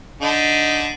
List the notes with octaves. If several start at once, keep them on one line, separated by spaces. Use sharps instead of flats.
D3 D#4